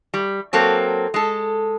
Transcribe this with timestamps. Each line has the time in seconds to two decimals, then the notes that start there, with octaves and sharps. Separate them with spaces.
0.14 G3
0.53 F#3 A#3 C4 A4
1.14 G#3 A4